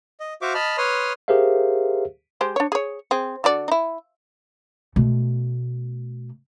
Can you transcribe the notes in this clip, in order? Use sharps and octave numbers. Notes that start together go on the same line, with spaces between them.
D#5
F#4 C5 E5 F5 C#6 D6
D#5 A5 B5 F6
B4 C#5 C6 D#6 F6
G4 G#4 A#4 C5 E5 F5
G#3 G4 C5
D4 C#5
G#4 C#5
C4 G#4
D3 F#4 D5
D#4 E4
B2 A3